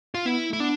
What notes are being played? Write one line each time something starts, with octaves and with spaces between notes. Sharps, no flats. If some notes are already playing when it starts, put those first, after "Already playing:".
F4
B3 E4
A3 E4
B3 D4